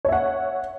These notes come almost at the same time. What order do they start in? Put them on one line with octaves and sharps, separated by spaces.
C#5 E5 F#5